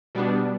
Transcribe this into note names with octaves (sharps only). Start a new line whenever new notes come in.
B2 G3 B3 D4